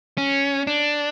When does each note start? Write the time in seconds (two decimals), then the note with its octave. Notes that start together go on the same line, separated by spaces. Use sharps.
0.18 C#4
0.67 D4